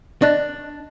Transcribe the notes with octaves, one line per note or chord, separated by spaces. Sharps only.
D4 D5 D#5 F#6